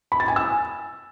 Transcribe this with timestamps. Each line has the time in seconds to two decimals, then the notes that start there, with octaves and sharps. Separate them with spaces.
0.12 B5
0.20 A6
0.28 G#5
0.36 E6